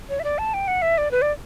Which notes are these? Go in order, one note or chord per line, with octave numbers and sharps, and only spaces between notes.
C#5
E5
D5
A5
G5
F#5
E5
D5
B4
D5